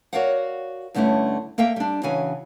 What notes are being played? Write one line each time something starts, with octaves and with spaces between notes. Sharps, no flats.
F#4 A#4 C#5 D5 F5 F#5
G2 D3 A3 C#4 E4
A#3 A4 E5 F5 G5
G3 D4
C#3 E3 F#4 G#5